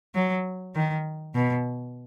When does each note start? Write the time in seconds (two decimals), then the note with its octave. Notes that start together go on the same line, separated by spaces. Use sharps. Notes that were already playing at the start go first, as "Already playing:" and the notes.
0.15 F#3
0.75 D#3
1.35 B2